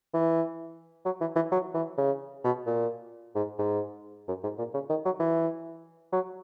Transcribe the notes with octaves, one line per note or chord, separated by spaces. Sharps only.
E3
F#3
E3
E3
F#3
E3
C#3
B2
A#2
G#2
G#2
F#2
G#2
A#2
C#3
D#3
F#3
E3
F#3